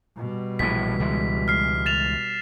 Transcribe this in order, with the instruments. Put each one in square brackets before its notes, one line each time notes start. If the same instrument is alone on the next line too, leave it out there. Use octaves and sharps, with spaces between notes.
[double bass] B2 G3
[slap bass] A#1 A2 E3 [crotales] B6
[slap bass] C#2 E3 G#3
[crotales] F6 C7
A6 E7 F7